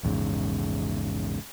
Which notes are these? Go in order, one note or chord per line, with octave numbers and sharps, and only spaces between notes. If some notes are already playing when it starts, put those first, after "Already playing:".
A#1 E2 G#2 C#3